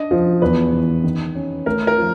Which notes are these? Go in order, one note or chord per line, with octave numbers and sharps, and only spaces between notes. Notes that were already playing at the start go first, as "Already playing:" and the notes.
Already playing: D4 D#5
F3
E2 B4
E3
D#3
C#4
A3 A#4
A#4
F3